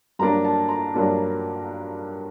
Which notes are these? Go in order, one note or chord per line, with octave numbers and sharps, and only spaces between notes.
G2 F#3 A#3 D4 A#5
A5
A#5
G2 F#3 A#3 D4